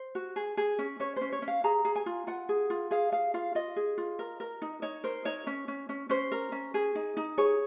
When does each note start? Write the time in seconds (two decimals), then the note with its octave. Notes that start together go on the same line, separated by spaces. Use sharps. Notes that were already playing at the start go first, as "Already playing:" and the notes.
Already playing: C5
0.15 F#4
0.36 G#4
0.57 G#4
0.79 C#4
1.00 C#4 C#5
1.16 C#4 C5
1.32 C#5
1.42 C#4
1.48 F5
1.64 G#4 A#5
1.85 G#4
1.95 G#5
2.06 F4
2.27 F4 F#5
2.49 G#4
2.70 F4
2.91 G#4 F5
3.12 G#4 F5
3.34 F4 F5
3.55 F4 D#5
3.76 G#4
3.98 F4
4.19 A#4
4.40 A#4
4.62 D#4
4.82 D#4 C#5
5.04 A#4 C5
5.25 D#4 C#5
5.47 C#4
5.68 C#4
5.89 C#4
6.09 C#4 C5
6.32 A#4
6.52 C#4
6.74 G#4
6.95 D#4
7.17 D#4
7.38 G#4 C#5